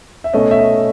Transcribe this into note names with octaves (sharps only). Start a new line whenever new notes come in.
E5
B2 A3 C#4 D#5
E5
D#5